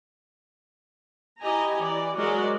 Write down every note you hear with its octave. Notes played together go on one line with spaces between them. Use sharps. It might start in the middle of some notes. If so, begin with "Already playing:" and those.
E4 G4 D#5 G#5 A#5
E3 D5
F#3 G#3 F#4 A#4 D5 D#5